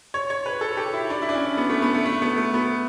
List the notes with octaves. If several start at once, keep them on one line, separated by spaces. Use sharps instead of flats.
C#5
C#5
B4
A4
G4
E4
D4
E4
D4
C#4
B3
A3
B3
A3
A3
B3
A3
B3